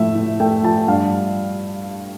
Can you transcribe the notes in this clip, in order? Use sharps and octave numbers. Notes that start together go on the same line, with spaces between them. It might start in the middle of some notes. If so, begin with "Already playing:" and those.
Already playing: A2 F3 A3 E5
A2
A3 G5
F3 A5
G2 F5